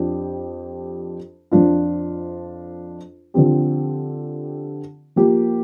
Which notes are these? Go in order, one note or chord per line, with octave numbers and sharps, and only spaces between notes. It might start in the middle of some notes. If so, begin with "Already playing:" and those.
Already playing: F2 F3 D4 G4
F2 F3 D4 F4
D3 F3 C4 G4
F3 A#3 G4